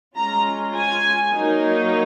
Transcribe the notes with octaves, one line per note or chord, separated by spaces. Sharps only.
G#3 C#4 F4 A#5
G#5
F#3 A#3 D#4